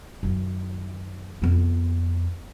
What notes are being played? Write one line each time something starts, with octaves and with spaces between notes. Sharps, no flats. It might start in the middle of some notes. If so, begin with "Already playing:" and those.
F#2 D#3
F2 B3